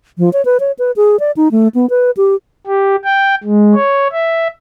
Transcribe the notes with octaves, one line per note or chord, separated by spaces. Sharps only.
F3
C#5
B4
C#5
B4
G#4
D5
D#4
A3
B3
B4
G4
G4
G5
G#3
C#5
E5